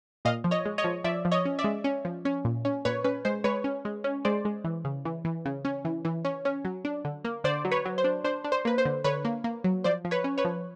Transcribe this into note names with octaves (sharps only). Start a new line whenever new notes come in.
A#2 D#5 F5
F3
C#5 D#5
G#3
C#5 D#5
F3
F3 D5 E5
F3
C#5 D#5
C#4
D5 E5
G#3
C#4
F3
C#4
A#2
C#4
A#2 B4 C#5
C#4 B4
G#3 C5
G#3 B4 C#5
C#4
G#3
C#4
G#3 C5 D5
G#3
E3
C#3
E3
E3
C#3
C#4
E3
E3
C#4
C#4
F#3
D4
D3
A#3
D3 C5 D5
F#3
B4 C#5
F#3
C5
D4
D4 C5
D4
C5
A#3 B4
C5
D3
D3 B4 C#5
A#3
A#3
F#3
F3 C5 D5
F3
B4 C#5
C#4
B4 C#5
F3